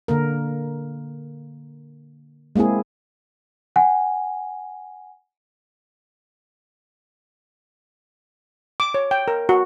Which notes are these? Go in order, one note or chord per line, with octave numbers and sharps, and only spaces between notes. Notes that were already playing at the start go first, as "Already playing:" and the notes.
D3 A#3 A#4
G#3 A#3 C4 E4 G#4
F#5 G#5
D6
C#5
G5
A#4
F#4